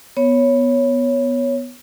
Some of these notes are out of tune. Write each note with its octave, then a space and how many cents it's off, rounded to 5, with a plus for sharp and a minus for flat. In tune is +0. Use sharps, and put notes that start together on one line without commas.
B3 +0 C#5 +0